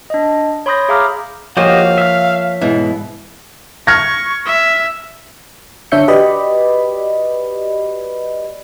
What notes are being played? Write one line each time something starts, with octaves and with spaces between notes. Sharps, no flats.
D4 D#5
C#5 B5 C6 D#6 G6 A#6
G#4 E5 F5 A#5 D6 F6
F3 A#3 F#4 G4 C5 C#5 D#5 F5
E5 F6
G#2 B2 E3
C#6 F6 G#6 A#6
E5
D3 D4 C#5 E5 G6 C#7
F#4 G4 B4 D5 D#5 B5